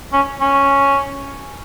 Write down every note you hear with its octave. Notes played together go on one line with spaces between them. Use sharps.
C#4
C#4